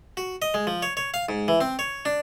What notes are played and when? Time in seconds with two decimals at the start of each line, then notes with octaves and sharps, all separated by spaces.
0.17 F#4
0.42 D#5
0.54 G#3
0.67 F3
0.82 C#5
0.97 C#5
1.14 F5
1.29 G#2
1.48 E3
1.61 C4
1.79 C#5
2.05 D4